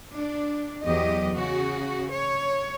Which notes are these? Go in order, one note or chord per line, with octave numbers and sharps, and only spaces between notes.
D4
E2 F#3 G4 D#5
C#3 F#4
C#5